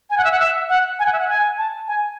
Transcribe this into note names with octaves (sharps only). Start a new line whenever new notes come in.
G#5
F#5
E5
F#5
E5
F#5
G#5
F#5
E5
F#5
G#5
A5
G#5